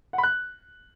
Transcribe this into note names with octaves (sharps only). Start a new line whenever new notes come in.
F#5
B5
F#6